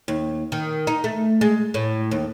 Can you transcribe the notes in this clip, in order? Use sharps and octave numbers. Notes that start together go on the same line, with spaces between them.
D#2
D#3
D#4
A3
G#3
A2
D#2